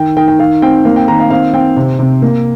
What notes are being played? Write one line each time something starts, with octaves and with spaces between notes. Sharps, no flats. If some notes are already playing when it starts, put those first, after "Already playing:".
Already playing: D#3 G5
D#3 G5
G5
D#3 F5
C4 G5
A#3 F5
G5
D#3 A#5
F5
C4 F5
C4 G5
C3
C3
A#3